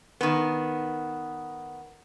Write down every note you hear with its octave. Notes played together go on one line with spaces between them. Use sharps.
D#3 B3